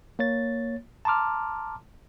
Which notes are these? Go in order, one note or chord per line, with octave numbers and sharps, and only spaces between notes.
A#3 C#5 A6
A5 A#5 C6 D6 F6